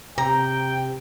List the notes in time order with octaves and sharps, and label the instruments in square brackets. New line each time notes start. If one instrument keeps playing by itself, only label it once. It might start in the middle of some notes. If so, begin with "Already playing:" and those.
[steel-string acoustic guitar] C3 [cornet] G5 [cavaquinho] A#5